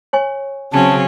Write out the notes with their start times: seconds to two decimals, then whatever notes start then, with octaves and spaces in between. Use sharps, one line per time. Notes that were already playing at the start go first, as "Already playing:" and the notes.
0.13 C#5 G#5 C#6
0.73 C#3 F#3 C4 C#4 A5